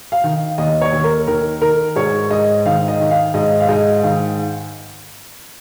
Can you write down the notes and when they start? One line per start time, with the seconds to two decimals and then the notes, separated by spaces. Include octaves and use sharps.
0.12 F5
0.24 D#3
0.58 D#2 D#5
0.81 C#5
0.92 D#2
1.04 A#4
1.27 D#3 A#4
1.61 D#3 A#4
1.96 G#2 C#5
2.30 G#2 D#5
2.65 D#3 F5
2.88 D#5
3.00 D#3
3.11 F5
3.34 G#2 D#5
3.60 F5
3.68 G#2 D#5
4.03 D#3 F5